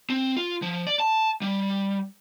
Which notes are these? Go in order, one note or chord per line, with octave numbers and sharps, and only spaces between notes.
C4
F4
F3
D5
A5
G3